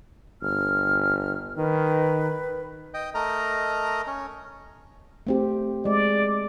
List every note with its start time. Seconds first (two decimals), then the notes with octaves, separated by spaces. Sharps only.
0.42 G1 F6
1.57 D#3 B4
2.94 D#5 G5
3.15 A3 A#4 D#5 A#5
4.07 C#4
5.27 A3 C4 G4
5.85 G#3 D5